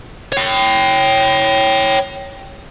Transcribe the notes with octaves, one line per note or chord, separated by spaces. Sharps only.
C#5 G5